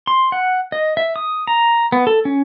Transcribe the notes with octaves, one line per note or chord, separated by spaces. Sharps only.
C6
F#5
D#5
E5
D#6
A#5
B3
A4
C#4